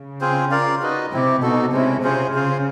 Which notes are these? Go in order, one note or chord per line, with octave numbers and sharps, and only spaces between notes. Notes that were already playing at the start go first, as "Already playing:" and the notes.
Already playing: C#3
C4 F4 G#4 C5
F4 A#4 D5 F5
D#4 F#4 B4 D#5
C3 C4 E4 G4
B2 D#4 F#4 A4
C3 G#3 C#4 E4
C3 C#4 F4 G#4 C5
C#3 F4 G#4 C5 F5